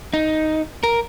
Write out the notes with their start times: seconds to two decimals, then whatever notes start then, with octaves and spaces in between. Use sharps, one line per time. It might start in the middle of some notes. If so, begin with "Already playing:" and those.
0.14 D#4
0.83 A#4